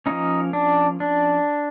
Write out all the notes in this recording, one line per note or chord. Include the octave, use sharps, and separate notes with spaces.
F3 A#3 C#4 D#4
D4
D4